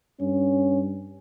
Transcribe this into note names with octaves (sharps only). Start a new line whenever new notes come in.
G2 C#4